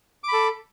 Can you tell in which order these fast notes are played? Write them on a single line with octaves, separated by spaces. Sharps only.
D6 B5 A4